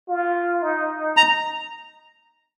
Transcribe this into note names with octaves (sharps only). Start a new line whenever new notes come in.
F4
D#4
A#5